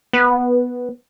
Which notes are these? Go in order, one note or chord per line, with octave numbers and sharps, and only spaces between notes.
B3